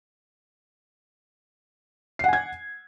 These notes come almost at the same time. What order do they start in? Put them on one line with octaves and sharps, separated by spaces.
C7 F#5 G#5 G#6